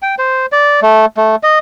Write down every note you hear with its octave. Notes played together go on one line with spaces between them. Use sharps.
G5
C5
D5
A3
A3
D#5